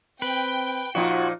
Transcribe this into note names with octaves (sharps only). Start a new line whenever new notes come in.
C4 B4 G5
A#2 F3 D#4 F4 F#4